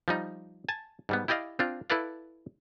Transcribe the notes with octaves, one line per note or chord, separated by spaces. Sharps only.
F3 G3 D#4
G#5 A5
G#2 G3 B3
E4 G4 D5 D#5 F5
C4 D4 F4
E4 A4 B4 D5 F5